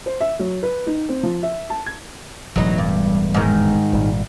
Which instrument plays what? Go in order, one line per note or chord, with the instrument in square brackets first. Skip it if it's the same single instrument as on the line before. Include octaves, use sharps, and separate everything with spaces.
[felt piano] C5
E5
F#3
B4
D#4
C4
F3
E5
A5
G#6
[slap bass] E1 A2 E3 [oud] F#3 D#4
[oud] G2
G#2 D#3
[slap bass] G#1 A#2 G3